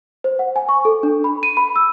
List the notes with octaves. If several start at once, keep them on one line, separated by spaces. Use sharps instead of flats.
C5
F#5
G#5
C#6
A4
D4
B5
D#7
B5
E6